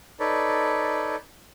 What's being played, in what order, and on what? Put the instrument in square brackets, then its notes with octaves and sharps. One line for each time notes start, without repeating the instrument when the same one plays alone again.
[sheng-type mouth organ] D#4 A4 B4 C#5 D5